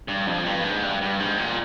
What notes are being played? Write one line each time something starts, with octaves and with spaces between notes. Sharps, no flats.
G2
F2
G2
G#2
G2
G2
G#2
A#2